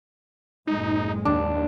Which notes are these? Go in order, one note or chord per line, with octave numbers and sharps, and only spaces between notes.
F#1 A2 G#3 D#4
D#2 D4